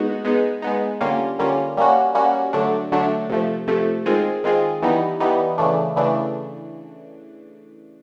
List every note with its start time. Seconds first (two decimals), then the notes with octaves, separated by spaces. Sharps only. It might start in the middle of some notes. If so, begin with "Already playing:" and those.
Already playing: G#3 B3 D#4 F#4
0.25 G#3 B3 D#4
0.62 G#3 B3 D#4
1.01 D3 G3 A#3 C#4 F4
1.39 D3 G3 A#3 C#4 F4
1.77 G3 A#3 C#4 F#4
2.15 G3 A#3 C#4 F#4
2.53 D3 F#3 A3 D4
2.92 D3 F#3 A3 D4
3.29 C3 F3 A3
3.67 C3 F3 A3
4.06 D#3 G#3 C4 F4 G#4
4.44 D#3 G#3 C4 F4 G#4
4.82 E3 G3 B3 D#4
5.20 E3 G3 B3 D#4
5.58 C#3 E3 A3 D4
5.96 C#3 E3 A3 D4